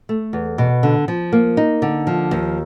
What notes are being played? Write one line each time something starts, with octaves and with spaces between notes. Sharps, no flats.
A3
E2
B2
D3
F3
A#3
D#4
D3
F3
D#2